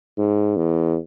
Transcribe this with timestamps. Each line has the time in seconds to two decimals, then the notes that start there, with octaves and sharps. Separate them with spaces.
0.18 G#2
0.57 E2